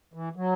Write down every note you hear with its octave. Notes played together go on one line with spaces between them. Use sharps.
E3
F#3